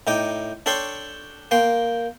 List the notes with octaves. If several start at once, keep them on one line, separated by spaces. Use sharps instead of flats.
A2 D#4 G5 D6
D4 A4 C#5 G5 C6 C#6
A#3 G5 C6